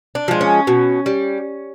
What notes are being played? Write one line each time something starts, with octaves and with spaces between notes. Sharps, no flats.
D4
F3 G#3
C#4
B2
G3